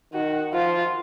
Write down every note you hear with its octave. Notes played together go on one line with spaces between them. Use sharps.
D#3 F#4
F3 F4